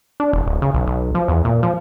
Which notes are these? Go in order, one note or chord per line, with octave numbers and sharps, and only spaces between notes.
D4
E1
D1
C#3
B1
B1
F3
E2
A#2
F3